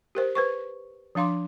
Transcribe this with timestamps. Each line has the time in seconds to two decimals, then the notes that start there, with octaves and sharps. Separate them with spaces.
0.15 G4 A#4 C5
0.35 B4 C5 C#6
1.15 F3 D4 F5 C6 D6